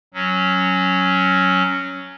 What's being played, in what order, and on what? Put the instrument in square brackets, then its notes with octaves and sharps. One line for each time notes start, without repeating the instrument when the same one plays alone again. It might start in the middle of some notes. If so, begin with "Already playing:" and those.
[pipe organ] F#3 C#4